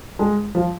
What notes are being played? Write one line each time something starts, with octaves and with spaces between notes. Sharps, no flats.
G#3
F3